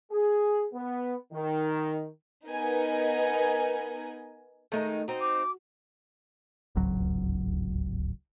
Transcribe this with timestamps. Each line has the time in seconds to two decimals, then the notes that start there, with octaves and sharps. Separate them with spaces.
0.11 G#4
0.73 B3
1.33 D#3
2.48 B3 D#4 A#4 B4 D#5 G#5
4.72 D#3 G#3 A3 D#4 A4
5.08 C4 D#4 F#4
5.21 D6
6.76 D1 G#1 C#2 F#3